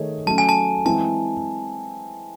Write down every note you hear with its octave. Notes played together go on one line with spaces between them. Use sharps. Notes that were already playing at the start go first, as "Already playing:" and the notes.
Already playing: D#3 A3 D#4 G#4 C#5
F#3 A3 C#4 A5
G#5
A5
E3 G#3 C4 E4 A5